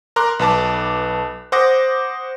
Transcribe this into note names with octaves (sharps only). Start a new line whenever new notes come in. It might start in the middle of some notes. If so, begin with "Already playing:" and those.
A#4 A#5 C6 D6 F#6
B1 B4 A5 D6
C5 F#5 D6 D#6 A#6